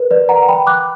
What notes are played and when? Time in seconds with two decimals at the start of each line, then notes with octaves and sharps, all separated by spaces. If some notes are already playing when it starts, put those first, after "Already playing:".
Already playing: A#4 B4
0.11 B4 D5
0.29 F#5 A#5
0.49 G5 B5
0.67 D6 F#6